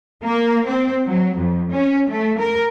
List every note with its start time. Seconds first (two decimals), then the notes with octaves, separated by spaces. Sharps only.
0.23 A#3
0.66 C4
1.06 F#3
1.37 F2
1.71 C#4
2.09 A3
2.39 A#4